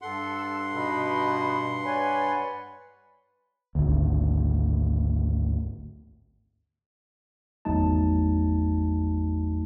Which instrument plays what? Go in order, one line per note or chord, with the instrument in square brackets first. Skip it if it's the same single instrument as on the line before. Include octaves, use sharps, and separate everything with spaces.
[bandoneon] G2 F#5 C6 [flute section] A4
[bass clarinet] B2 [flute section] D#4 B4 B5
[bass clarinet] B4 [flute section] C#5 D5 G#5
[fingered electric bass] G#1 D2
[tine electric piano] G#1 E2 F#3 A3 D#4 A5